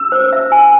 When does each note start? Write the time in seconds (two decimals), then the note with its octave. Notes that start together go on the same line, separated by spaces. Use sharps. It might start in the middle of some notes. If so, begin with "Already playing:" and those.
Already playing: E6
0.12 C5
0.33 E5
0.52 G#5